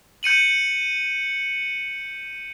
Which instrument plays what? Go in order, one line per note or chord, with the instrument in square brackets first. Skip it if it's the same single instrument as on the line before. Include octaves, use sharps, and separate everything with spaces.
[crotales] G6 C#7 D#7 F#7